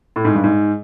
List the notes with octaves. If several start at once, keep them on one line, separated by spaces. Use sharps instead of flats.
A2
G#2
G2
G#2